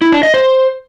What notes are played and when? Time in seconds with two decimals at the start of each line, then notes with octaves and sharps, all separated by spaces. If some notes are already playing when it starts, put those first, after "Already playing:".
0.01 E4
0.12 D4
0.23 D#5
0.34 C5